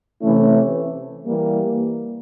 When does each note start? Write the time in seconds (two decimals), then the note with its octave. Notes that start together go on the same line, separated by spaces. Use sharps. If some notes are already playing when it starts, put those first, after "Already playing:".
0.20 C3 E3 A3 C#4 E4
1.26 E3 G3 A#3